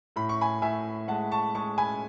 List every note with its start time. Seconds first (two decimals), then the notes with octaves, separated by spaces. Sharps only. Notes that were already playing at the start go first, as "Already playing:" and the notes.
0.16 A2 B5
0.29 C#6
0.41 G#5 B5
0.62 A2 E5 G#5
1.08 G#3 F#5 A5
1.31 A5 C#6
1.55 G#3 A5 C#6
1.78 G#5 B5